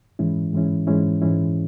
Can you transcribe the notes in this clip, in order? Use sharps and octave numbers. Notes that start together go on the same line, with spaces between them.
G#2 E3 G#3 C#4 E4
G#2 E3 G#3 C#4 E4
G#2 E3 G#3 C#4 E4
G#2 E3 G#3 C#4 E4